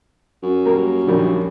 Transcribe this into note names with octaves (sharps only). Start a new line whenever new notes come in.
F#2
G3 A#3 A#4
A#1 D#3 G3